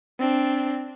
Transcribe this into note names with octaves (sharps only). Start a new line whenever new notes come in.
C4 D4